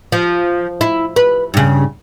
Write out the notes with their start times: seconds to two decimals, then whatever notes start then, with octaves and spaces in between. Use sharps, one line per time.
0.12 F3
0.81 E4
1.16 B4
1.54 G2 C#3